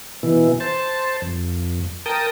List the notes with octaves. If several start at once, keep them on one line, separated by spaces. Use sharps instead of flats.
B2 E3
C5 A5
F2
A#4 G5 A5 D#6